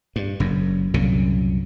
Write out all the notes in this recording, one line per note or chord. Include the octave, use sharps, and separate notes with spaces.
G2
F#1 F#2
C2 F#2 A#2 C#3